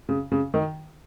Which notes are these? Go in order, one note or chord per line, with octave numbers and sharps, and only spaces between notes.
C#3
C#3
D#3